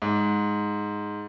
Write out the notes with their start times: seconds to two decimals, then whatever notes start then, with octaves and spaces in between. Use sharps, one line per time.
0.02 G#2